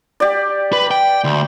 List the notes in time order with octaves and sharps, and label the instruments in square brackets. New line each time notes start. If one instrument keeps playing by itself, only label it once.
[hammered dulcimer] G4 D5
[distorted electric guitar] B4
G5
D2